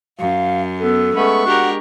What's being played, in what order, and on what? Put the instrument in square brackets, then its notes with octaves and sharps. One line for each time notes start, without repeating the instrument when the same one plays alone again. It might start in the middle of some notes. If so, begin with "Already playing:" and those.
[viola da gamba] F#2 [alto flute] F5
[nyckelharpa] B3 B4 [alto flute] A4
[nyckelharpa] G#3 C#6 [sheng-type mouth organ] A3 B3 B5 [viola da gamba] C#4
[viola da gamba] D4 G4 A#4 [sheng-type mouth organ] F#4 F#5